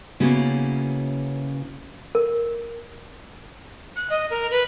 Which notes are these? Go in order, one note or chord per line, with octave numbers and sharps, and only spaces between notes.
C#3 A#3 B3 C#4 E4 F#4
A#4
F#6
D#5
A#4
B4